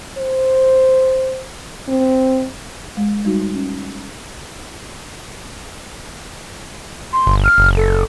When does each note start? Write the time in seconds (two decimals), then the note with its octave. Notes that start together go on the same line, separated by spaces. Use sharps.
0.18 C5
1.88 C4
2.97 G#3
3.25 G3 D#4 F#4
3.55 C#4
7.13 C6
7.27 G1
7.44 F6
7.58 F#1
7.77 A4